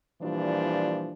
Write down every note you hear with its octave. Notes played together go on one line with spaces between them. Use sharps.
A#2 E3 F3 G3 D4